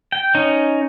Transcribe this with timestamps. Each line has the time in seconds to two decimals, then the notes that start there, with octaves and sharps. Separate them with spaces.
0.12 G5
0.35 C#4 D#4